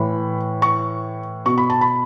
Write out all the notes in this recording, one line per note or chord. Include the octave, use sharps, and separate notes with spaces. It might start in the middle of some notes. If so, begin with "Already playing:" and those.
Already playing: A2 E3 B5
C#6
B2 C#6
B5
A5
B5